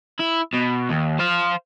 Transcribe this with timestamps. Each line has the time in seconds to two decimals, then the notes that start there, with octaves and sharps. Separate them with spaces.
0.20 E4
0.54 B2
0.90 D#2
1.19 C5 F5